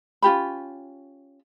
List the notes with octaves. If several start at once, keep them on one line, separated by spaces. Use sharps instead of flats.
C#4 F4 G4 B5